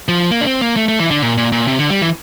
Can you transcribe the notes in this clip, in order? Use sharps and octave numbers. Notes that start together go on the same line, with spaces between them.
F3
A#3
D4
C4
A#3
A3
A3
E3
D3
A#2
A#2
A#2
C3
D3
G3
E3